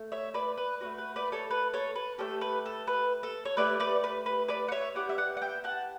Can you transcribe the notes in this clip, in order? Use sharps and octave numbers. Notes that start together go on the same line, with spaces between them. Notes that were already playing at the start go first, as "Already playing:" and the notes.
Already playing: A3
C#5 E5
B4 D5
B4
A3 D4 F#4 B4
B4
B4 D5
A4 C#5
B4
A4 C#5
B4
A3 C#4 G4 A4
B4
A4
B4
A4
C#5
A3 E4 G4 B4 D5
B4 D5
B4
B4
B4 D5
F#5
C#5 E5
B3 E4 G4 D5 F#5
E5
D5 F#5
F#5
E5 G5
F#5 A5